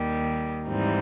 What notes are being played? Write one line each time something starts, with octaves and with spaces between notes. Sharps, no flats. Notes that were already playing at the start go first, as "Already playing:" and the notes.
Already playing: D#2 D#3 G3
G#2 E3 G3 C4 D#4